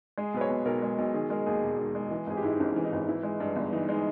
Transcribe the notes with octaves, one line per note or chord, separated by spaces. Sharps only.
G#3 G#4
B1 B4
C#5
B2
B1 A#4
G#3
B1
D#3 G#4
G#3 A#4
D#2 G#4
E1
D#3
G#3
E3
G#1 G#4
G4
G#2 E4
D#4
G#1 C#4
E3
D#4
G#1
E3 E4
G#3
G2
G1
E3 D#4
G#3 D#4